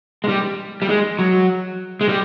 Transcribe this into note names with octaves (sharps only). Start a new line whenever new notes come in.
G#3
G3
G3
G#3
F#3
G#3
G3